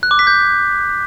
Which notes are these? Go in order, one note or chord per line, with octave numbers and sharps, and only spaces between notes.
F#6
D6
B6
G6